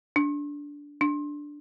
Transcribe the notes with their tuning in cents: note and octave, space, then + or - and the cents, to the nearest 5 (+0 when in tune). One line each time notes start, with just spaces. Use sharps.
D4 -15
D4 +0